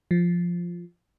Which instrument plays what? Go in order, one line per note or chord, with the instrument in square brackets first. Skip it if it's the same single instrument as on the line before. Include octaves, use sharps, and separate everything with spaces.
[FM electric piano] F3